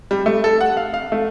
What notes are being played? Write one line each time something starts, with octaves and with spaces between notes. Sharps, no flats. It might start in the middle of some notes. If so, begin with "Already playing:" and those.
G3
A3
A4
F#5
F5
F5
A3